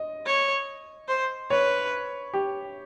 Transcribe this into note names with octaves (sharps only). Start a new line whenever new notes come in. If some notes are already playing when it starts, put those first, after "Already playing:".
Already playing: D#5
C#5
C5
B4 C#5
G4